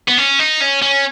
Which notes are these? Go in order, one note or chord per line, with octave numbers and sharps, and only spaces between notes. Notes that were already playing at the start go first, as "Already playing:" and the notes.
B3
C#4
D#4
C#4
C#4